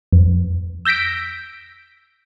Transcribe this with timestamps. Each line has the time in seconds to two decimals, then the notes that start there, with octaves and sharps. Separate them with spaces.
0.13 F2
0.85 E6 G6 A#6 B6 D7